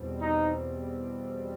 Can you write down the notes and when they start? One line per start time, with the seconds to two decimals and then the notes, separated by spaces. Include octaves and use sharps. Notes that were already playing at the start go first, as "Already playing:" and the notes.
Already playing: E2 B2 G3 C4
0.22 D#4